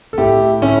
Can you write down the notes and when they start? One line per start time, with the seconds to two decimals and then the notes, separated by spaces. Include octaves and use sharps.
0.13 A4
0.18 A2 E4 G4
0.62 A2 C#4 E4